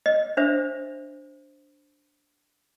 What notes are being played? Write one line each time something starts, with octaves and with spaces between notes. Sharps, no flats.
D#5
D4 C5 E5